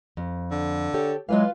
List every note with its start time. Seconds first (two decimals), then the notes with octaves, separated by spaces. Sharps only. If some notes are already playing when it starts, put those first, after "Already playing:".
0.17 F2
0.51 D3
0.94 G4 A4 C#5
1.29 E3 F#3 G#3 F4 B4 F5